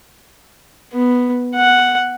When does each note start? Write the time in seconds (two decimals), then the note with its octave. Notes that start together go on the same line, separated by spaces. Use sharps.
0.93 B3
1.55 F#5